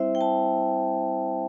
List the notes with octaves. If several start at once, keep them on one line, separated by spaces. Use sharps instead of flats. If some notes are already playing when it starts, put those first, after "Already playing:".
Already playing: G3 C4 E4 C5 E5
G5
A5